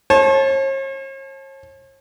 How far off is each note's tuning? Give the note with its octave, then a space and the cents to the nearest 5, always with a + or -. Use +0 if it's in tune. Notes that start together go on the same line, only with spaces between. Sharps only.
C#5 -45 A5 -25